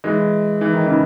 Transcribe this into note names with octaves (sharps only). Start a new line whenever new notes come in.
E3 G#3
E3
D#3
C#3 E3